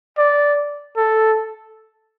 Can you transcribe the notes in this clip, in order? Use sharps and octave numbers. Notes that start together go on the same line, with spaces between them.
D5
A4